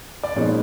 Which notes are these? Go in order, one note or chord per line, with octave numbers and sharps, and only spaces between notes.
D5
A#2 F3 G#3 B3 D#4 C#5